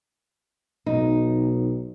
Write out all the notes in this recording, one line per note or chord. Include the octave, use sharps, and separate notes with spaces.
B1 D#4